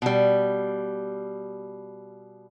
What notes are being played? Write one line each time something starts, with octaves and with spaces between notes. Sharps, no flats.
B2 G3